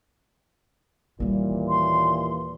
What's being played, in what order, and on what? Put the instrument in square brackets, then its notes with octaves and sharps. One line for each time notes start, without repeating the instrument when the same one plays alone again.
[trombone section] D#2 A#2 E3 [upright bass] G3 A#3
[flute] C6